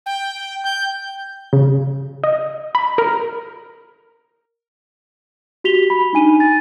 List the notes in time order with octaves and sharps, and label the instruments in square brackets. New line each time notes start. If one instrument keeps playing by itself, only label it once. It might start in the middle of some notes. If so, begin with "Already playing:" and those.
[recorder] G5
[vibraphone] G5 [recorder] G6
[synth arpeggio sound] C#3
D#5
B5
A#4
[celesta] F#4 G4 B6 F7 G7
B5
D4 D#4 G#5 D#7
A6